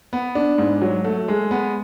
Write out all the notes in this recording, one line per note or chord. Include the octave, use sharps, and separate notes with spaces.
B3
D4
G#2
F#3
A3
G#3
B3